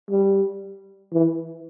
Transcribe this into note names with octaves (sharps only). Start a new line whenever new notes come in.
G3
E3